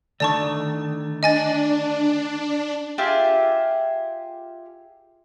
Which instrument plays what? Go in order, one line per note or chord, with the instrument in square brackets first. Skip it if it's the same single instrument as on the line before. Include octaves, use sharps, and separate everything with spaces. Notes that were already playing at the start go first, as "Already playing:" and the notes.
[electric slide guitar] D3 D#3 A3 [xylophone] D5 A5 C#6
[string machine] D4 [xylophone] D#5 G#5 A6
[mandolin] F4 G4 G#4 E5